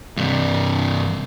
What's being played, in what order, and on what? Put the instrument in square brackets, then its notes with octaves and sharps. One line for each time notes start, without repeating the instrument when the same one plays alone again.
[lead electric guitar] G2 C3